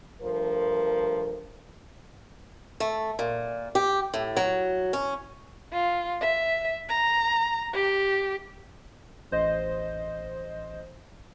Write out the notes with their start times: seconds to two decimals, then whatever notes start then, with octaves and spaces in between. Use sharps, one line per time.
0.22 G2 F3 A3 A#4
2.80 A3
3.19 A#2
3.75 G4
4.14 A2
4.37 F#3
4.93 C#4
5.73 F4
6.21 E5
6.89 A#5
7.73 G4
9.32 A1 C5 D#5